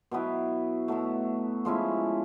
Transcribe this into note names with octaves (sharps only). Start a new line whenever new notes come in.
B2 F#3 B3 E4
B2 F#3 A3
F3 G#3 C#4 E4